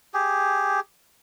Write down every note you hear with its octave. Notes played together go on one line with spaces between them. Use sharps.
G4 G#4